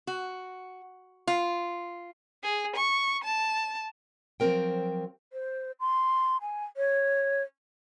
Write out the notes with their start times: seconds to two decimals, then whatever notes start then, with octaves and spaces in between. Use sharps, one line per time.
0.07 F#4
1.27 F4
2.43 G#4
2.76 C#6
3.24 A5
4.40 F3 F#3 A#3 C4 A#4 G5
5.33 C5
5.80 C6
6.41 G#5
6.77 C#5